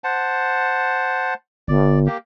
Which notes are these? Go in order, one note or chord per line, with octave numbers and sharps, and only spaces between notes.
C5 F#5 A5
G1 D5
A#3 G4